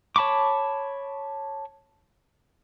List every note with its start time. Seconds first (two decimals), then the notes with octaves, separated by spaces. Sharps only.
0.16 C#5 A5 B5 C#6 D6